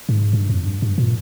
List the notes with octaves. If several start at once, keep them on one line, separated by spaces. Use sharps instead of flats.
G#2
G2
F2
G2
G2
A#2